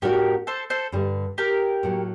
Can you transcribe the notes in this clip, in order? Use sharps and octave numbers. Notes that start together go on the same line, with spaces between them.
A2 A3 D4 F#4 G4 A#4
A4 C5
A4 C5
G2 D3 G3
G4 A#4
A2 F#3 A#3